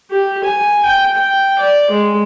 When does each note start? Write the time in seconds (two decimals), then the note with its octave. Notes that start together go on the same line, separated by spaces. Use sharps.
0.10 G4
0.44 G#5
0.85 G5
1.16 G5
1.59 D5
1.90 G#3